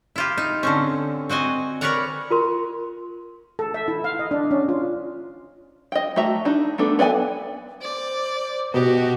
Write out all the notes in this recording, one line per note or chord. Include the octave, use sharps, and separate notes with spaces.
E4 F4 G4
D#4
D3 C4 C#4
C4 F#4 D#5 G#5
A#4 B4 C#5 D5 F#5 A#5
F4 A#4 C6
A4
E5
E4
F5
D#5
D4
C#4
F4
D#5 G5
A3 F#4 E5 A#5
D4 D#4
A3 B3 D4 A4
B3 D5 F#5 G#5
C5 D5
B2 F#4 G4 D#5